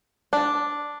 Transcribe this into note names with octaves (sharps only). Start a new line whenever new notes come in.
D4